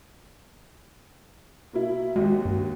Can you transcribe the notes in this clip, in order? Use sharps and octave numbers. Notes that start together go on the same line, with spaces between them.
B2 A#3 E4
D#2 G#3 F#4
G2